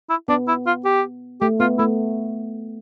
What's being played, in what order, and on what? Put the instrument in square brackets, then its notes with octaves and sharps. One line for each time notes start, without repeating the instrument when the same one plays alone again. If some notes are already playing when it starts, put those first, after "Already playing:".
[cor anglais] E4
[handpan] B3 [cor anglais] D4
[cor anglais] E4
F4
G4
[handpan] A3 [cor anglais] G4
[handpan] B3 [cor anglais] F4
[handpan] A3 [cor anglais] E4